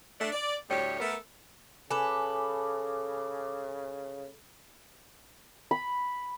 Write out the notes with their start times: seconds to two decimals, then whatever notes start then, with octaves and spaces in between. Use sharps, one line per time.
0.20 A3 D4
0.32 D5
0.69 D2 A2 G3 G4 C#5
1.00 A3 B3 A4 A#4
1.91 C#3 A4 B4 G#5 D6
5.71 B5